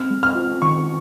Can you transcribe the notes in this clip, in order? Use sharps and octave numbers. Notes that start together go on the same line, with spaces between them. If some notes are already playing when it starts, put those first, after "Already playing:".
Already playing: C4 F6
G#3
F6
F4
D#3 C#6